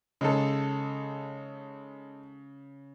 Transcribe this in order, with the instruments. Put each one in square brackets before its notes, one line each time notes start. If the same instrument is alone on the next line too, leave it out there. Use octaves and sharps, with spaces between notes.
[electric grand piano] C#3 [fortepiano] G#3 D#4 A4